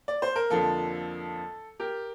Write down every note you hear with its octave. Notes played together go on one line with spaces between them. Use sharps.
D5
C5
A#4
F2 D3 F3 A#3 A4
G4 A#4